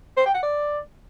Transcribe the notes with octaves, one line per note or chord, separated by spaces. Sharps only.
C5
G5
F#5
D5